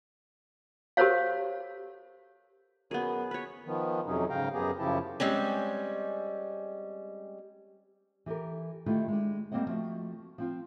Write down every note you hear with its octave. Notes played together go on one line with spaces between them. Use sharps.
G4 A4 A#4 C5 C#5 F5
F#2 B3 G#4
B4 C#5
D#3 F3 B3
F2 C3 F#3 C#4 D#4
G#2 C#3 F5 G5 A#5
F#2 B3 G4 G#4 A#5
F#2 C#3 F3 E4 G4 A5
G3 G#3 C4 C#4
E3 G4 A4 A#4
D#3 A3 E4 F4 G4
G#3 D4
G3 A#3 C4 D5 D#5 F#5
F3 A3 F#4
F3 C4 F4